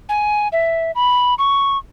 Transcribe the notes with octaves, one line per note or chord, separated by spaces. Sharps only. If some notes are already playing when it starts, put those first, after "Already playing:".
G#5
E5
B5
C#6